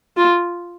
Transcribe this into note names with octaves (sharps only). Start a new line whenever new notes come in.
F4